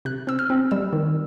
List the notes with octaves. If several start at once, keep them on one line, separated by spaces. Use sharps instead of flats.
C3 F#6
C4 E6
F6
C4
G3 E6
D#3